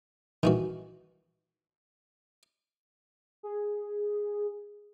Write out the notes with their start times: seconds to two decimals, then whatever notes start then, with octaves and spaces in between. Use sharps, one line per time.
0.43 D#3 E3 F#4
3.43 G#4